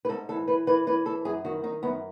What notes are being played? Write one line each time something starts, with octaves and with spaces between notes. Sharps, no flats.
B4
G#2 A4
E3 A4
E3 B4
E3 B4
E3 B4
E3 A4
F#2 G#4
D#3 F#4
D#3 D#4
F#2 B3